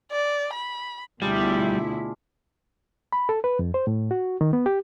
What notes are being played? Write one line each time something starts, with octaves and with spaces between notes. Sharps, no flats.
D5
B5
D2 B2 G3 D4 E4 F4 G#4
B5
A4
B4
F2
C5
A2
F#4
D#3
B3
G4